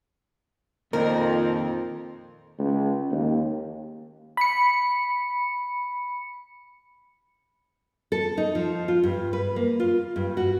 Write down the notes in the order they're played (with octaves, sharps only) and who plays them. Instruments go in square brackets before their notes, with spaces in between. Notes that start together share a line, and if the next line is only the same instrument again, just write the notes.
[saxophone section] F2 [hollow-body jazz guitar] A#2 D#3 [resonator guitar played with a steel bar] A#4
[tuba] C#2
D#2
[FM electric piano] B5 C#7
[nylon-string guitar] A4
D#4
F3
F4
G2
B4
A#3
F4
G2
F#4